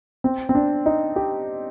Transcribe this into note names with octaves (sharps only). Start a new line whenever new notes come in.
C4
C4
D4
D#4
G4